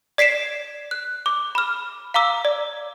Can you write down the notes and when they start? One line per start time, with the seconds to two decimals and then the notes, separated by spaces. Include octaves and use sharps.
0.18 D5 B6 C7 D7 E7
0.91 F#6
1.26 D6
1.55 B5 F6
2.14 F5 A#5 D6 E6
2.45 D5